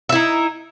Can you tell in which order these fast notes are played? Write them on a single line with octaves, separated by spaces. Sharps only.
E5 E4 D#4